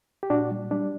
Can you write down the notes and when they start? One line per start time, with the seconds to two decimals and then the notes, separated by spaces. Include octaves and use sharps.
0.23 G4
0.30 A#2 D4 F#4
0.51 G3
0.71 G3 D4